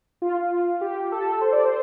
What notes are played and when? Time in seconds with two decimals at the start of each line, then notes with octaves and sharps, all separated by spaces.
0.22 F4
0.81 G4
1.12 A4
1.41 C5
1.52 D5
1.65 C5